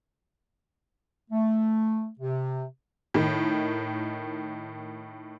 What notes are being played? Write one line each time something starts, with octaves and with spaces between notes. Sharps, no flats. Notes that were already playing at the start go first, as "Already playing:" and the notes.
A3
C3
A2 D#3